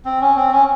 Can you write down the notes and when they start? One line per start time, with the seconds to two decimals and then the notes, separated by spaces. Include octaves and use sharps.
0.05 C4
0.21 C#4
0.36 C4
0.52 C#4